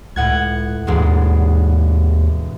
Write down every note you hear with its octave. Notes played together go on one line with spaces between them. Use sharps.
C#2 A2 F#5 G#6
E1 D#2 G#2 G#3